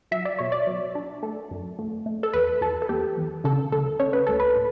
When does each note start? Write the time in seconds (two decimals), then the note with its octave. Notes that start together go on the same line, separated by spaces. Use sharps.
0.11 F#3 E5
0.25 D5
0.38 B2 C#5
0.52 D5
0.67 F#3
0.95 D4
1.23 A3 A4
1.51 F#2
1.79 A3
2.06 A3
2.23 A4
2.33 E2 B4
2.61 E2 A4
2.82 A4
2.89 E2 G4
3.17 E2
3.44 C#3 A4
3.72 D2 A4
4.00 C#3 C#5
4.13 B4
4.27 D2 A4
4.40 B4
4.55 A2